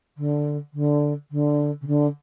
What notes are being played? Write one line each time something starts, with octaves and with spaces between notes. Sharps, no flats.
D3
D3
D3
C#3
D3